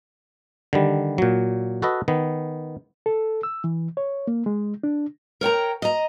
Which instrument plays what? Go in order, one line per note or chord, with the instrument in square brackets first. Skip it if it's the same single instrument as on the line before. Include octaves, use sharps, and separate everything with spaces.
[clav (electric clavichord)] D3 D#3 G3
A#2 F#3
F#4 A4 B4 D#5
D#3 B3
[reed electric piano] A4
E6
E3
C#5
A#3
G#3
D4
[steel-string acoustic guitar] A#4 C#5 G5 A#5
D#5 A#5